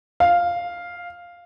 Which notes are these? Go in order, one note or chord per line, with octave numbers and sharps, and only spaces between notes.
F5